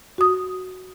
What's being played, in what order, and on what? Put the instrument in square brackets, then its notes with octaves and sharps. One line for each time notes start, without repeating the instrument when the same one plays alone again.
[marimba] F#4 D#6